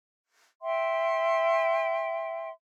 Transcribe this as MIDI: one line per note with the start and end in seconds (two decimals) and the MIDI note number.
0.62 2.50 76
0.62 2.50 79
0.62 2.50 84